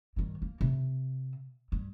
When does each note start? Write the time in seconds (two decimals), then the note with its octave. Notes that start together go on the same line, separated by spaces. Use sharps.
0.16 G2 D#3
0.42 A#3
0.61 C3
1.72 G2